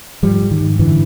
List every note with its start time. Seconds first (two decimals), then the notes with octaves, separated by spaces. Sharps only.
0.23 G#2 F3 G3
0.42 G#2
0.51 D#3
0.61 G#2
0.79 F#2 D3 E3